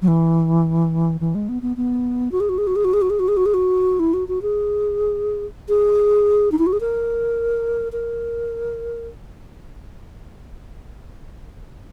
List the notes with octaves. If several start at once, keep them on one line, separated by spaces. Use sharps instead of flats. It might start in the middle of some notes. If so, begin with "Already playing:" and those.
F#3
E3
E3
G#3
B3
B3
B3
F#4
G#4
F#4
G#4
F#4
G#4
F#4
G#4
F#4
G#4
F#4
G#4
F#4
G#4
F#4
E4
F#4
F#4
G#4
G#4
D#4
E4
F#4
G#4
A#4
A#4